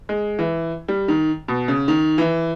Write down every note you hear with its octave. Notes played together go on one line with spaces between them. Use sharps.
G#3
E3
G3
D#3
B2
C#3
D#3
E3